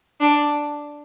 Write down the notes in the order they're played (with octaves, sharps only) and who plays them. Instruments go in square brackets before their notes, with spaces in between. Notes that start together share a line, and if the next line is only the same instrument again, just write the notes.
[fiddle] D4